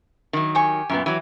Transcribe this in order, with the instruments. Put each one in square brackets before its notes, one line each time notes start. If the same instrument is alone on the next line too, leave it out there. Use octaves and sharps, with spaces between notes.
[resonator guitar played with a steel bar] D#3 F#3
[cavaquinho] G4 G#5 C#6
[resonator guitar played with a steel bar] F#2 A#2 B3
E3 F#3